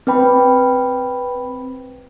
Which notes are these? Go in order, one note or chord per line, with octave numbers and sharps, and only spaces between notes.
C4 B4 G5 B5